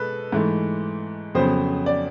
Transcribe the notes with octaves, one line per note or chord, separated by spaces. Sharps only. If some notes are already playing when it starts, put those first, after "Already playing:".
Already playing: B2 G#3 A4 B4
G#2 E3 A3
F2 C#3 F#3 B3 C5
D5